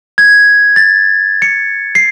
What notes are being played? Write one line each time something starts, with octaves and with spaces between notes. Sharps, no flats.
G#6
A6
C#7
C7